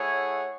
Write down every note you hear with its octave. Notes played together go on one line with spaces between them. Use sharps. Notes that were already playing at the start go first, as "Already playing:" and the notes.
Already playing: A3 E4 G#4 C#5 F#5